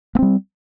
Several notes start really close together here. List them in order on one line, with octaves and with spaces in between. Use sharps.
A#3 C4 G3